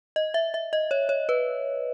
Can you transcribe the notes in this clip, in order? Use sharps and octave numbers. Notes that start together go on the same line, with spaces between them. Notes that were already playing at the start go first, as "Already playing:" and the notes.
D#5
E5
E5
D#5
C#5
C#5
B4